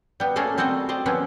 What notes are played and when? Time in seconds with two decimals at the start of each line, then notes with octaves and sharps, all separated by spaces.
0.20 G3 B3
0.36 A3 A#3 C#4 G#4 A4 F5
0.58 G3 C4 F#4 A4 D#5
0.89 G4 C5 D5 D#5
1.06 F3 A#3 B3 C#4 E4